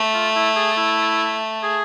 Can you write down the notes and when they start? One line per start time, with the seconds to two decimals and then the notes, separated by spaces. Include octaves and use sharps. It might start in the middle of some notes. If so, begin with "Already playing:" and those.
Already playing: A3
0.14 F4
0.35 E4
0.56 G#4
0.77 E4
1.63 G#4